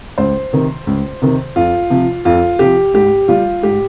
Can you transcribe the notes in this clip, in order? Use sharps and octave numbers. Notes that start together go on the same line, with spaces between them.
C#2 C5
C3 D#3
C#2
C3 D#3
F2 F4
C3 F3
F2 F4
C3 F3 G4
G#2 G4
G3 F4
G#2 G4